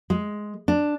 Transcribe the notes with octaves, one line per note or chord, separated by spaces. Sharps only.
G#3
D4